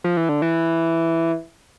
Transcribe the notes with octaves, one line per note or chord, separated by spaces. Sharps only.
F3
E3
D3
E3